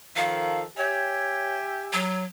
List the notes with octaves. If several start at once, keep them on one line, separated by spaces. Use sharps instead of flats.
D#3 F3 A4 F5
G4 C#5 E5 G#5
F#3